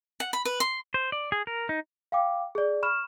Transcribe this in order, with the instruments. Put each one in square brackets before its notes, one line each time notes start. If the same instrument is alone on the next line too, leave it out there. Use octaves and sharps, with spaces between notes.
[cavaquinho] F#5
B5
B4
C6
[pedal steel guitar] C5
D5
G#4
A#4
D#4
[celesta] F5 G5 D6
G#4 D5
B5 C#6 F6 E7